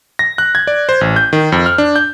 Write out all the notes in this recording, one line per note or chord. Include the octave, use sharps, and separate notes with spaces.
A#6
F#6
G#6
D5
C5
A1
G6
D#3
F2
F6
D4
G6